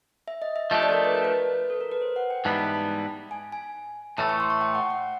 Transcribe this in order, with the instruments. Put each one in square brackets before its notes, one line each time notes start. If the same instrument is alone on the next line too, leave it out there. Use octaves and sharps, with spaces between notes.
[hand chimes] E5
D#5
E5
[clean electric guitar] F3 A3 D4 G4 [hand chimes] D#5
[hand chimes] D5
A4
A#4
B4
A#4
B4
A4
A#4
B4
C5
F#5
G5
[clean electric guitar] G#2 E3 G3 B3 [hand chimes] A5
[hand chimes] A5
A5
G#5
G#5
[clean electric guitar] A2 E3 A3 [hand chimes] A5
[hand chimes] C#6
C6
C#6
G5
F#5
F#5